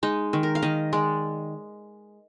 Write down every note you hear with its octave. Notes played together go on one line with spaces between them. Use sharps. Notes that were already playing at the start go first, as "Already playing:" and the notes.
G#3 D#4
D#3
A#4
F5
D#3 D#5
G#3 D5